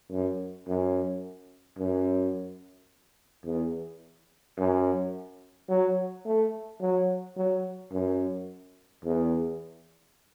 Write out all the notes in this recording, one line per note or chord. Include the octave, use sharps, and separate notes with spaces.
F#2
F#2
F#2
E2
F#2
F#3
A3
F#3
F#3
F#2
E2